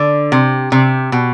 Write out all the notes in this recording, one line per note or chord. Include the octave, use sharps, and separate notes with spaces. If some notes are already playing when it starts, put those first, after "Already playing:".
Already playing: D3
C3
C3
B2